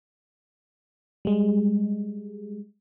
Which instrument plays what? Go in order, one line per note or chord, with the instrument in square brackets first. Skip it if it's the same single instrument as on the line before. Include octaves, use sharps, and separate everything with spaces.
[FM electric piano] G3 G#3